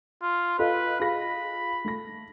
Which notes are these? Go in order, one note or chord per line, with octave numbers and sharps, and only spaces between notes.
F4
F4 A4 B4 D#5
F4 G#4 B5 A#6
A3 A#6